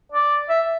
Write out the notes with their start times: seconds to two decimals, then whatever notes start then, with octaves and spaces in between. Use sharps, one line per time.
0.12 D5
0.49 E5